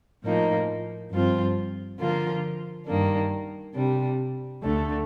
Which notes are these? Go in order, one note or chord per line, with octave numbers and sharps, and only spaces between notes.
A2 F3 A#3 D#4
G2 F3 C4 F4
D3 F3 A#3 F4
G2 D#3 A#3 D4
C3 G3 D4
D2 D3 A3